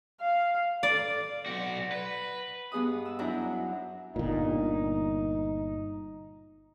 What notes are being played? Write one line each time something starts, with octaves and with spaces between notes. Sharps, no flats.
F5
D5
B1 F#4
B4
G2 B3 G#4 D#5 D#6
E6
F#2 F#3 D4 E4 A#5
G1 A#2 D#4